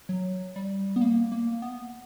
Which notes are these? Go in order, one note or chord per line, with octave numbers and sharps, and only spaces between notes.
F#3
G3
B3
A#3
A#3
B3